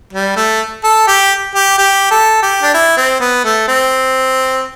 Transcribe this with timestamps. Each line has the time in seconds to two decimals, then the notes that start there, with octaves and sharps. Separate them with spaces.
0.13 G3
0.36 A3
0.84 A4
1.08 G4
1.55 G4
1.78 G4
2.11 A4
2.42 G4
2.63 D4
2.74 E4
2.97 C4
3.20 B3
3.45 A3
3.68 C4